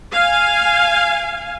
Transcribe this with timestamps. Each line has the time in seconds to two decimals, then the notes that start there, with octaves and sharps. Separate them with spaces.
0.11 F5 G#5